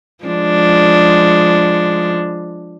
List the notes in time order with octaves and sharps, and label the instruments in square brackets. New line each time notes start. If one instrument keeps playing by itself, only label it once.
[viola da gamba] F3 G#3 D4